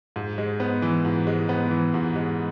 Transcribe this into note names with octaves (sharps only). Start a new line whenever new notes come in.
G#2
G#3
B3
E3
G#2
G#3
B3
E3
G#2
G#3